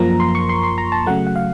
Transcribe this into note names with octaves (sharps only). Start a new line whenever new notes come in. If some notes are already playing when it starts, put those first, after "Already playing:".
Already playing: F#2 F3 A#3 A#5
C6
C#6
C6
C6
A#5
A5
C#3 F#3 A3 F#5
F#5
F5